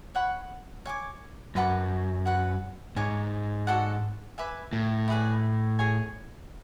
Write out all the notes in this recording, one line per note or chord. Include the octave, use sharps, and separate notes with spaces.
C#5 F#5 B5
C#5 G#5 D6
F#2 B4 F#5 A5 D6
F#4 B4 F#5
G#2 C#5 G#5 D6
F#4 A4 D5 F#5
B4 E5 G#5 D6
A2
E4 G#4 B4 D5
G#4 C#5 G#5